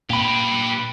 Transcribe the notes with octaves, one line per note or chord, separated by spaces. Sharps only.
A#2 G4 B4 B5